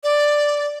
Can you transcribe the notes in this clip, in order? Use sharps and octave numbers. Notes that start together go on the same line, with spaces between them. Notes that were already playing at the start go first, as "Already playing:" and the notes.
D5